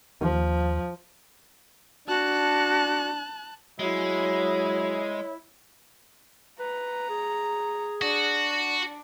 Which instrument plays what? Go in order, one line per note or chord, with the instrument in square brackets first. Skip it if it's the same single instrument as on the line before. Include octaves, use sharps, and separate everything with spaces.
[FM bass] D#2 [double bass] F3
[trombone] D4 [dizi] F#4 [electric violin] A5 F#6
[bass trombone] F#3 [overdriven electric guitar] G#3 [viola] E4 [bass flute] C#5
[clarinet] B4 [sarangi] A#5
[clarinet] G#4
[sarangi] D4 [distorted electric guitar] F#4